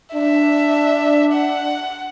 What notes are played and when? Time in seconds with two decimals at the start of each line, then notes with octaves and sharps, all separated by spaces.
0.14 D4 E5
1.33 F#5